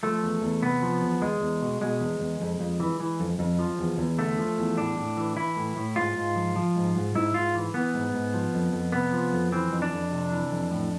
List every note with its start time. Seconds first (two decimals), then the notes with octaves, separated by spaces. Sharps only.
0.03 F3 A3
0.23 E2
0.42 E2
0.62 C3 B3
0.82 F3
1.01 E2
1.21 E2 G#3
1.41 E2
1.61 B2
1.81 B2 G#3
2.00 E2
2.20 E2
2.41 F2
2.60 F2
2.80 E3
3.00 E3
3.20 F2
3.39 F2
3.59 F3
3.79 E2
3.98 E2
4.18 D3 A3
4.38 F3
4.58 E2
4.77 A2 D4
4.97 A2
5.17 E3
5.37 E3 E4
5.56 A2
5.76 A2
5.96 G#2 F4
6.16 G#2
6.35 F3
6.56 F3
6.76 G#2
6.95 G#2
7.15 G#2 E4
7.34 G#2 F4
7.55 E3
7.74 E3 B3
7.94 G#2
8.14 G#2
8.34 F3
8.54 F2
8.73 F2
8.92 C3 B3
9.13 F3
9.33 F2
9.52 E3 C4
9.72 F2
9.82 D4
9.92 F2
10.12 C3
10.31 E3
10.51 F2
10.71 A2